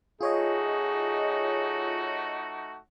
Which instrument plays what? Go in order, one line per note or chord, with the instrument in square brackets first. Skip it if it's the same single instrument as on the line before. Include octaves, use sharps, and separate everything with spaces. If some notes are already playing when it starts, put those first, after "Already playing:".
[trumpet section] A3 D#4 F#4 [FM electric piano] F4 C#5 D#5 [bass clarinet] G#4